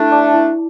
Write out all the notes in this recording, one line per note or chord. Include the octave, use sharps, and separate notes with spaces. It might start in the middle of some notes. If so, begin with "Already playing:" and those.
Already playing: A3 D4 E4
D5 A5 D6
E4